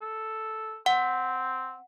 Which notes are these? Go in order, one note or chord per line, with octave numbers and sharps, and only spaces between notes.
A4
C4 F#5